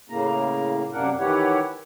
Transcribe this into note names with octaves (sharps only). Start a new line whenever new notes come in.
A2 C#3 A#3 A#5
F#2 C3 A#3 D4 A#4 F#5
D#3 E3 E4 G4 C#5 F#5